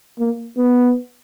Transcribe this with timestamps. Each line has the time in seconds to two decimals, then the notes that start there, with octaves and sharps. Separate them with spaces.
0.19 A#3
0.57 B3